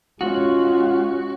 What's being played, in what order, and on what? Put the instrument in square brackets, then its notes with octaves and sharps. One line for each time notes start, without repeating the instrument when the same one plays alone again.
[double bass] G#3 C#4 [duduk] F4 [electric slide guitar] F#4